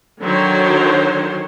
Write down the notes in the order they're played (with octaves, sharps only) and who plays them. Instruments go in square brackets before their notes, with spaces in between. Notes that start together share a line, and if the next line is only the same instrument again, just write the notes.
[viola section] D3 D#3 F#3 C5 C#5